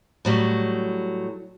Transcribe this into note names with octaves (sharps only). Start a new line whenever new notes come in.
A2 F#3 G3